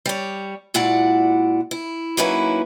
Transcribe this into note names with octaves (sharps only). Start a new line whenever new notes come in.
G3 C#5
A#2 G#3 E4 F#4 D5 F#5
E4
F#3 A#3 C#4 D#4 E4 B4